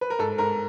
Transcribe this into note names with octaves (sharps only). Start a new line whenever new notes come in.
B4
A#4
G#2 A4
G#2 A#4